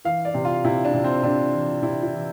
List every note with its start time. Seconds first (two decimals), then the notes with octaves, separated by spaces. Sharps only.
0.05 E3 F5
0.25 D5
0.34 C3
0.45 F4
0.64 C3 E4
0.85 D4
0.94 C3
1.04 C4
1.23 C3 D4
1.53 E3
1.82 C3 E4
2.03 E4
2.13 E3